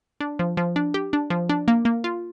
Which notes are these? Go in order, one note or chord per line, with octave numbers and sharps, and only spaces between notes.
D4
F3
F3
D4
G4
D4
F3
D4
A#3
A#3
F4